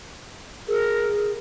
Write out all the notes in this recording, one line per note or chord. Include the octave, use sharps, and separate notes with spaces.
G#4 A#4